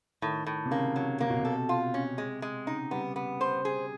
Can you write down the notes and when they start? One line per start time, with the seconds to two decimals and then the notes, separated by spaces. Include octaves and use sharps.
0.22 A2 D#3
0.46 A2
0.65 C3
0.71 C#3 A#3
0.96 F#3
1.20 C3 A#3
1.30 B2
1.39 C3
1.45 A4
1.69 F4
1.94 C#4
2.18 G#3
2.42 G#3
2.66 C#3 D#4
2.91 G3 B3
3.16 B3
3.41 C5
3.65 G#4